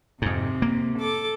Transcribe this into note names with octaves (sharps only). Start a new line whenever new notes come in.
F2 G#2 C3
A#3
A4 D6